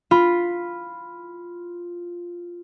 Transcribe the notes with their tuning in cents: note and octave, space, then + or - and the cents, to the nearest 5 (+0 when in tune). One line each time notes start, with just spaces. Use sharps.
F4 +0 B5 +0